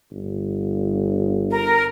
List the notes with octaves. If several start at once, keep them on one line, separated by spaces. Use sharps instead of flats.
G1
A#4